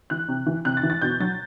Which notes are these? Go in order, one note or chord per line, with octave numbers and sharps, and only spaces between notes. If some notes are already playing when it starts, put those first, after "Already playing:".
E3 F#6
C3
E3
C3 F#6
A6
E3
A6
B2 G6
F#3 A6